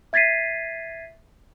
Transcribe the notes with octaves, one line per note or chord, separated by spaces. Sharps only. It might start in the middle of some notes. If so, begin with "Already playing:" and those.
E5 G#6 A6 B6 C7 D#7